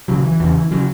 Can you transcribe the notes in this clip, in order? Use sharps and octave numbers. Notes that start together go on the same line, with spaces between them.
C#2 C#3 F#3
E3
E2 C#3 E3
C#3 F#3